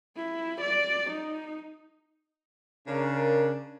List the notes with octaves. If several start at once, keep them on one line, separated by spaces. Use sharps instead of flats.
E4
D5
D#4
C#3 D4 A#4